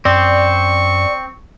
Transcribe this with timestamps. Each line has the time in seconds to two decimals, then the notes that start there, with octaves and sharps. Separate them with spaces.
0.05 F#2 C4 D5 C#6